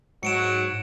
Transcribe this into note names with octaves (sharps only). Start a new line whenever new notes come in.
G#2 F#3 C#7 D7 E7